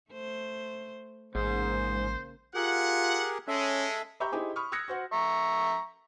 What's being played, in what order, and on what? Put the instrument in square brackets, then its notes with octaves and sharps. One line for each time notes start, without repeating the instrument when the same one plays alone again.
[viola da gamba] A3 C5
[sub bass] A1 [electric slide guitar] G#2 [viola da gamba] C#3 A#3 [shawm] C5
[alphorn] F4 [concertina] G4 G#4 A#4 [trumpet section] F#5
[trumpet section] G#3 [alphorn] C#4 [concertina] A4 E5
[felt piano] G4 E5 A#5 B5 C#6 G6
D#4 E4 G4 G#4 C5
B5 C#6 D#6 F6
D#6 E6 F#6 G#6 A#6 C#7
F#4 C5 F#5
[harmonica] E5 A#5 C#6